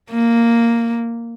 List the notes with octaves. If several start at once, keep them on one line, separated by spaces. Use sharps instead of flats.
A#3